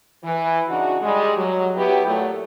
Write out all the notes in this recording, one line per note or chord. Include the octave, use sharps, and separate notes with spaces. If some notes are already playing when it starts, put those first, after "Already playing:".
E3
C#3 D4 D#4 F#4
G3 G#3
F#3
F#3 B3 E4 G4
A#2 F#3 A3